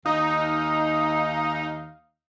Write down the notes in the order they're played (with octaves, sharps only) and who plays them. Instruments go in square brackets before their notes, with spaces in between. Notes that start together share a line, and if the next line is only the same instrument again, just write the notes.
[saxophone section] D#2 F5 [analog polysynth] D#4